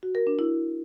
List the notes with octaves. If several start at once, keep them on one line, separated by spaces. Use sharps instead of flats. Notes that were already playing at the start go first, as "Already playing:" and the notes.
F#4
A#4
D4
E4